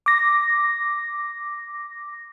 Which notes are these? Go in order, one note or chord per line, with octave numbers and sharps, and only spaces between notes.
D6 A#6